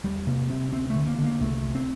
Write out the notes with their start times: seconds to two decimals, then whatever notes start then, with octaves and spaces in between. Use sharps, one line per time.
0.04 E2 G3
0.27 C3 A#3
0.50 C3 C4
0.72 D2 C4
0.90 A3
0.95 D3
1.07 A#3
1.18 D3
1.24 A#3
1.40 C2 A3
1.63 C3
1.75 C4